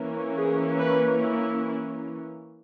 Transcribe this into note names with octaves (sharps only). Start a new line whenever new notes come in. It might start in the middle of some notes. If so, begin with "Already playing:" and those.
Already playing: E3 A#3 C#4
G#4
B4
E4